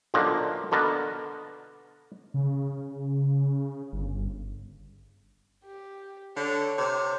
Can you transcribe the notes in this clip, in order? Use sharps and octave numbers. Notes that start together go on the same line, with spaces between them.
B1 A#2 D3 F3 A#3
B2 D3 B3 A#4 A5
C#3
G1
G4
D3 C#5
C3